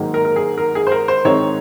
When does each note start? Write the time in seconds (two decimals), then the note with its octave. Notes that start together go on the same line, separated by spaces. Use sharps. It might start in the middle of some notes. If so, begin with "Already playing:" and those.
Already playing: G#2 D#3 F#3 A#3
0.14 A#4
0.25 A#4
0.36 G#4
0.58 A#4
0.75 G#4
0.87 C5
0.92 A#4
1.08 C5
1.24 G#2 D#3 G#3 C4 D#4 C#5